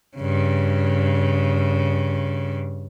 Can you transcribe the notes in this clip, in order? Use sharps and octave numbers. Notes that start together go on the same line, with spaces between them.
G2 C#3